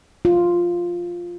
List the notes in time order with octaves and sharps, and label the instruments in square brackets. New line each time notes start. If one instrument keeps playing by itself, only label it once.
[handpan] F4